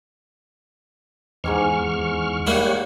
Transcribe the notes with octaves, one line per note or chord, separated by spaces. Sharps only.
E2 G#2 G#5 C#6 D6 F6
G3 A#3 E4 G4 C#5 F#5